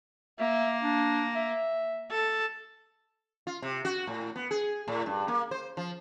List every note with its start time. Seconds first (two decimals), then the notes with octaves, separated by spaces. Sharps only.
0.39 A#3 E5
0.83 D4
1.35 E5
2.11 A4
3.47 F4
3.62 C3
3.85 F#4
4.07 A2
4.36 B3
4.51 G#4
4.88 A2
5.06 G2
5.28 A#3
5.51 C5
5.77 F3